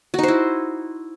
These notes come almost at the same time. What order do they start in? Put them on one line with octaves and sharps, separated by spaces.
F#4 D#4 C5 E4